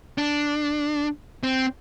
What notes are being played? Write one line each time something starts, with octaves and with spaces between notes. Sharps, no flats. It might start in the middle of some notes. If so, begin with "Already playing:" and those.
D4
C4